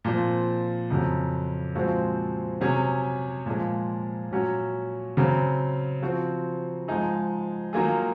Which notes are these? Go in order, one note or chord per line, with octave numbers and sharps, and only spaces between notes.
A#2 F3 C4
F2 C#3 F#3
A#2 F3 G#3 C4 F#4
C3 F#3 C#4 G#4
A#2 F3 G#3
A#2 F#3 C#4 F#4
C#3 F#3 C4
F3 C4 F#4
G#2 F3 G#3 D#4 G#4
D#3 F#3 A#3 F4 G#4